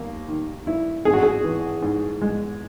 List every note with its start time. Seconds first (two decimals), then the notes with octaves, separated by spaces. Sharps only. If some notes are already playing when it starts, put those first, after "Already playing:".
Already playing: D#2 A#3
0.28 D#3
0.67 E4
1.05 G#1 G#4
1.14 F#4
1.23 G#4
1.44 E3
1.82 G#2
2.21 G#3